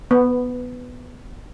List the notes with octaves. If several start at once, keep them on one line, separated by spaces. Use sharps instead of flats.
B3